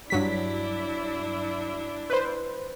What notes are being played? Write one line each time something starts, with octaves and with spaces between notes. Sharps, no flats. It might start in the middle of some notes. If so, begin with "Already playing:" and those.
G2 F#3 D4 E4 B6
B4 C5